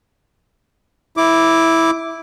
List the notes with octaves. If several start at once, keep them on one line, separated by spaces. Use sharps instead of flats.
E4 D6